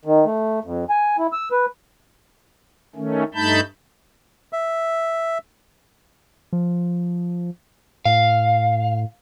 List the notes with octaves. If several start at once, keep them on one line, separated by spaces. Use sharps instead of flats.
D#3
A3
F2
G#5
E4
E6
B4
D#3 A3 C#4
G2 A3 D#4 A5 B5 G6
E5
F3
A2 F5